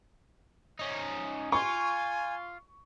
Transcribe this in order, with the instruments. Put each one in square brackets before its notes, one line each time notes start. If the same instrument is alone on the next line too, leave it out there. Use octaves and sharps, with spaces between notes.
[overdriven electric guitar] C#4 D#4
[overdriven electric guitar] F4 [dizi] G#5 [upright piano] C#6